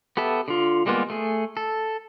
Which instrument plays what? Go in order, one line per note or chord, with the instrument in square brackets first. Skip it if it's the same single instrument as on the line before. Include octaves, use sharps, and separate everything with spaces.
[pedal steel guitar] B3 G4 A4 E5
D3 F4
G3 G#3 A#3 B3 F4
A3 G#4
A4